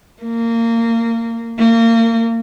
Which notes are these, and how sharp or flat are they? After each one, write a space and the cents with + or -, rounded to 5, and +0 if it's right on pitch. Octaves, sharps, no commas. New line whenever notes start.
A#3 -25
A#3 -30